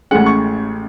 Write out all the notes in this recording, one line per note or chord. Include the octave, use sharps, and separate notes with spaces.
A1 A2 G#3 C#4 F#5
C#6